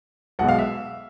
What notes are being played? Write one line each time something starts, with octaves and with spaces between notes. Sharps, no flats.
B1 B2 G#3 F#5
F5
E5